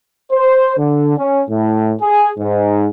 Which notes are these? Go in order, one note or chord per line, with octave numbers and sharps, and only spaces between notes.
C5
D3
C#4
A2
G#4
G#2